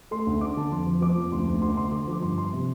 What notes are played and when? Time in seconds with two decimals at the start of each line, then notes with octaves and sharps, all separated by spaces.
0.11 A3 C6
0.27 D2
0.41 D4 D6
0.57 D3 A5
0.72 F2 C6
0.87 F3
1.02 F3 D6
1.17 F2
1.32 D2 C6
1.48 D2
1.62 D2 C6
1.77 D2 C6
1.92 D3 D6
2.02 C6
2.07 F3
2.13 D6
2.22 G2 C6
2.38 F3 C6
2.53 C3